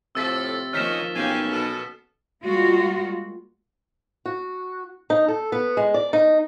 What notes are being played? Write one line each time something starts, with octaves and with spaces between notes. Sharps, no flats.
A2 C3 F3 A4 E6 A6 B6
D#3 F3 A#3 C#4 D#4 F6 B6 E7
B1 A#3 C#4 G4 F5 G5 G#5
B2 A4
G3 G#3 A#3 F4 F#4
F#4
D#4
A4
B3
G#3
D5
D#4